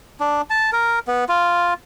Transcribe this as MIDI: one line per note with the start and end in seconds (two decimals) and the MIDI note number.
0.20 0.42 62
0.50 0.70 81
0.72 0.99 70
1.08 1.24 59
1.29 1.74 65